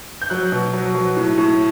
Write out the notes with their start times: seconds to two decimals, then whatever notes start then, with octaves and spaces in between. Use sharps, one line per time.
0.22 G6
0.30 F#3 F#6
0.52 B2
0.73 F#3
0.95 F#3
1.17 A2
1.38 A2